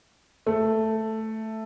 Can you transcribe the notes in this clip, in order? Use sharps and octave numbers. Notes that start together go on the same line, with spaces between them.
A3